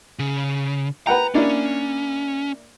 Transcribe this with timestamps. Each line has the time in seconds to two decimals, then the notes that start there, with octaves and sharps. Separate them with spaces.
0.19 C#3
1.07 B4 F#5 G5 A#5
1.35 A#3 C#4 D4 E4